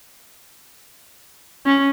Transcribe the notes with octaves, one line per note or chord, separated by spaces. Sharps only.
C#4